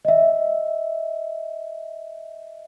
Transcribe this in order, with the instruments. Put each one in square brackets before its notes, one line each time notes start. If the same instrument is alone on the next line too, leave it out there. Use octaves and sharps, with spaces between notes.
[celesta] D#5 E5